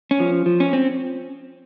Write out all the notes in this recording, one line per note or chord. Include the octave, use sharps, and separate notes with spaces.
C#4
F3
F3
C#4
C4